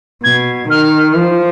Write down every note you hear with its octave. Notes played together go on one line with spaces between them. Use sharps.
B2 G#6
D#3 F6
F3